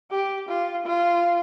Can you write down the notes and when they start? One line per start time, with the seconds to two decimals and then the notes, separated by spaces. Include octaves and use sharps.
0.11 G4
0.49 F4
0.86 F4